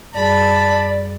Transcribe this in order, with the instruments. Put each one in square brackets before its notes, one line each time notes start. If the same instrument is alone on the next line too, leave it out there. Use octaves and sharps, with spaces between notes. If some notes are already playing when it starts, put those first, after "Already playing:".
[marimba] F#2 G3 G#4 [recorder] D5 [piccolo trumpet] A5 [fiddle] B5